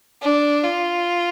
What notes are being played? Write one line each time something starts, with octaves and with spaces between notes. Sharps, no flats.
D4
F4